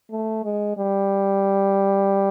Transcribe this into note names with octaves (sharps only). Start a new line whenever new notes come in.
A3
G#3
G3